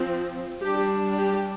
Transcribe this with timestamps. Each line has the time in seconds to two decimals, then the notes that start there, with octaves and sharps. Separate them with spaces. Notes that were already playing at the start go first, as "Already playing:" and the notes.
Already playing: F3 C4
0.62 G3 D4 G4
1.18 G4